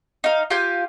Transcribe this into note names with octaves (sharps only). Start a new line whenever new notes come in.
D#4 F5
F4 G4 G5 G#5